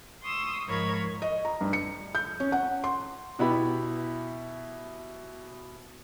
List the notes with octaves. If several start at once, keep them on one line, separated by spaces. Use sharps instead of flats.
C6 C#6 D#6 E6
G#2 F3 A#4 C#5 B5 G#6
D#5
A#5
G2
C#7
G6
C#4
F#5
C6
B2 B3 E4 G4 B5